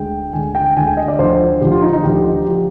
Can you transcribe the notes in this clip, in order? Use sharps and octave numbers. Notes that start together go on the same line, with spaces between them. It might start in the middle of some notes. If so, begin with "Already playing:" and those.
Already playing: D2 D3 G#3 G5
D2 D3 G#3 G#5
G5
D2 D3 G#3 G#5
G5
D#5
D5
D2 D3 F3 C5
D2 D3 F3 G4
F4
D#4
D#4
D2 D3 F3 G4
D3 F3 G4